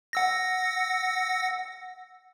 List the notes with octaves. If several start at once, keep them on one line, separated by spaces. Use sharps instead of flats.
F#5 E6 A#6